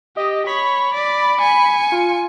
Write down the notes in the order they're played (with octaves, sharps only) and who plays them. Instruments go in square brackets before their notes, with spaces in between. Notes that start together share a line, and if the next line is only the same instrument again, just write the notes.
[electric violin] G4 [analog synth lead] D#5
[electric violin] C#5 [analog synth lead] B5
[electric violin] D5
G#5 C#7
[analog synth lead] F4